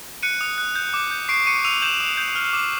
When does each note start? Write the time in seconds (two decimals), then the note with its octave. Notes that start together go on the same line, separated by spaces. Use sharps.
0.23 F#6 C#7 D#7
0.41 D#6
0.58 F#6
0.76 G6
0.94 D6
1.11 G6
1.29 C#6 C7 D7
1.47 C#6 C#7 D#7
1.64 E6 D#7 F7
1.82 G6 E7 F#7
2.01 D#6
2.17 G6
2.35 F6
2.53 D6